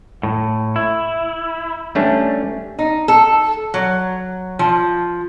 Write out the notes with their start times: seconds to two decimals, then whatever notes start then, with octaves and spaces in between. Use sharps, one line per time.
0.23 A2
0.76 E4
1.95 G3 A3 C#4 D4
2.79 D#4
3.08 A4
3.74 F#3
4.59 F3